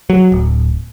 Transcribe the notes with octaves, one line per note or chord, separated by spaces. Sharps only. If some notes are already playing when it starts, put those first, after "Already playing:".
F#3
D1